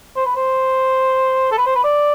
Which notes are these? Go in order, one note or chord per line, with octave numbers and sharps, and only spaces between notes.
C5
B4
C5
A4
B4
C5
B4
D5